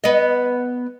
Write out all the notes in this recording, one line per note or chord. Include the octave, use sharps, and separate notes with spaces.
B3 D#5